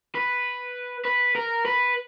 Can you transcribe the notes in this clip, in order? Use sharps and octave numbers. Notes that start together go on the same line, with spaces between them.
B4
B4
A#4
B4